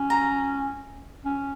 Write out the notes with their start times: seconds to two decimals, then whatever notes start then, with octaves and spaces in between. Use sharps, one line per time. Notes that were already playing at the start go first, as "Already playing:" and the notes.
Already playing: C#4
0.10 A#5
1.25 C#4